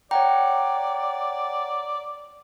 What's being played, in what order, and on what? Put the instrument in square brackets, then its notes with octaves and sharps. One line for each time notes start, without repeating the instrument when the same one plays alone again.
[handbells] C#5 F#5 A#5 [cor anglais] D5 [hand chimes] G5